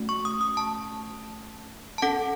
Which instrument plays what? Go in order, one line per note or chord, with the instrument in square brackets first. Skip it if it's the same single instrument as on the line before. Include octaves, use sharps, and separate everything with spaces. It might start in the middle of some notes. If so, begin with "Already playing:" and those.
Already playing: [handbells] A3 C#4 F#4
C#6
D#6
D#6
A5
A5
C#4 A4 F#5